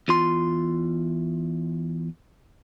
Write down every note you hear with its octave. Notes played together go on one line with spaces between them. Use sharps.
E2 F4 C6